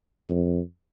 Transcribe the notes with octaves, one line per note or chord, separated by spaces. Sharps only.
F2